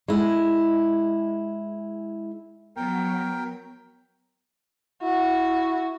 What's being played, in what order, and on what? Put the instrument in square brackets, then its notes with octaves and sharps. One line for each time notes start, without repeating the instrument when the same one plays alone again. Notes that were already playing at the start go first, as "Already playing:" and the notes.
[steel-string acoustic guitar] G#3 E4
[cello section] F#3 [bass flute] B3 [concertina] A#4 G5
[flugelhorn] E4 [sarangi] F#4